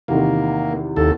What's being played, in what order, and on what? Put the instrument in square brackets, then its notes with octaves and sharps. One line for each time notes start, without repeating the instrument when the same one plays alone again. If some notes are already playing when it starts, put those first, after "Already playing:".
[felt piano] E2 C3 D#3 [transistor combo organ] A#3
[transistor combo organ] D#2 A4